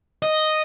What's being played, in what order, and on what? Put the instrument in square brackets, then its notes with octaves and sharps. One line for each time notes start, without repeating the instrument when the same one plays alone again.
[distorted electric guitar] D#5